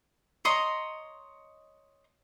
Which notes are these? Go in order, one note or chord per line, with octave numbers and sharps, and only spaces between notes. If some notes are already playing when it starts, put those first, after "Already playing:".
C#5 D#5 A#5 C6